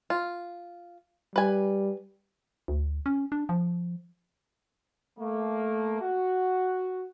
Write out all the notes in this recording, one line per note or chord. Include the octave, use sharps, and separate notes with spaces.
F4
G3 B4 G#5
D2
C#4
D4
F3
A3 A#3
F#4